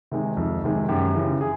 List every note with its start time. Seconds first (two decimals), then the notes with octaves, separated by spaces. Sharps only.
0.11 C3 D#3 G#3
0.37 F2
0.64 C3 D#3 G#3
0.89 F#2 G4
1.15 C#3 E3
1.41 G#4